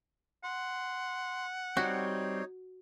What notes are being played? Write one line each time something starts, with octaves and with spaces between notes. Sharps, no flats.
F#5 C6
G3 C4 D#4 F#4 C#5